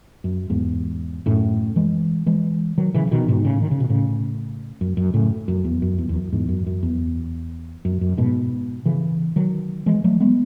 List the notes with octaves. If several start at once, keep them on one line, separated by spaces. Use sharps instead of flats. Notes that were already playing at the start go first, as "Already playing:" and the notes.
F#2
E2 G#2
F#2 A2
E3 G#3
E3 G#3
D#3 F#3
C#3 E3
E3
B2 D#3
G#2 B2
A2 C#3
D#3
C#3
B2
A2 C#3
F#2
F#2
A2 C#3
F#2
E2
F#2
E2
E2
F#2
E2 G#2
F#2
F#2
E2
F#2
F#2
G#2 B2
C#3 E3
D#3 F#3
E3 G#3
F#3 A3
G#3 B3